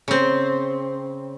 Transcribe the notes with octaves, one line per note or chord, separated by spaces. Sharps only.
C#3 C4